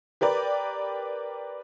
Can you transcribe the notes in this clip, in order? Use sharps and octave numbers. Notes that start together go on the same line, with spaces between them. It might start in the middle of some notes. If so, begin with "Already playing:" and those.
G4 A#4 B4 D5